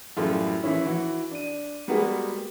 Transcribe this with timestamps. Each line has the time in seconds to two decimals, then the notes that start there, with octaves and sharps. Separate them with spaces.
0.17 F#2 A2 E3 G3 F4 A4
0.63 A#2 E3 F3 C#4 E4
0.85 E3 F#4
1.31 D4 D#7
1.88 G3 G#3 A#3 B3 F#4 G#4